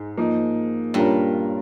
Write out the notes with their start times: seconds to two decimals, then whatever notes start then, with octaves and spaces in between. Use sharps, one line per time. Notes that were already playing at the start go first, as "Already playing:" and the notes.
Already playing: G#2
0.17 F3 A#3 D#4
0.94 G2 A#2 G3 C#4 F4 A#4